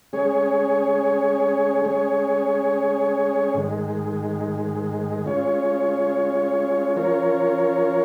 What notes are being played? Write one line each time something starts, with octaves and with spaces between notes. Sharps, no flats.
G#3 C#4 G#4 C#5
G#3 C#4 G#4 C#5
G#2 D#3 G#3
G#3 C#4 F4 C#5
F3 C#4 F4 A#4 C#5